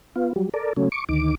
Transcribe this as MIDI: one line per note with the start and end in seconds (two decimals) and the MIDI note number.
0.16 0.33 59
0.16 0.33 65
0.36 0.49 54
0.36 0.49 55
0.54 0.73 69
0.54 0.73 70
0.54 0.73 74
0.77 0.89 49
0.77 0.89 54
0.77 0.89 57
0.77 0.89 61
0.92 1.04 85
0.92 1.04 86
1.09 1.35 38
1.09 1.35 51
1.09 1.35 86